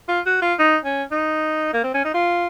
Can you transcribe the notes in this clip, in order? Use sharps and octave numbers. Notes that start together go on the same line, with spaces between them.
F4
F#4
F4
D#4
C#4
D#4
A#3
C4
C#4
D#4
F4